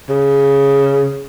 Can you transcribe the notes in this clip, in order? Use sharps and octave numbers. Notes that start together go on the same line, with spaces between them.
C#3